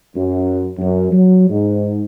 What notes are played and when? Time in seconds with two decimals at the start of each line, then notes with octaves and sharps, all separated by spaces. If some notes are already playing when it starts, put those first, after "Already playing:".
0.16 F#2
0.78 F#2
1.11 F#3
1.49 G#2